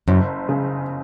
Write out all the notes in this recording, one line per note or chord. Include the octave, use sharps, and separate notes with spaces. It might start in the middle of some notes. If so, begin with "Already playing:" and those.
F#1 F#2
C#3